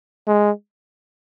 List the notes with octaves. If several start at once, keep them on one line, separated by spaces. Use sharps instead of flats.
G#3